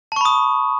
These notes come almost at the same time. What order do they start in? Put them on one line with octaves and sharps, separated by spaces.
A5 C#6 B5 D#6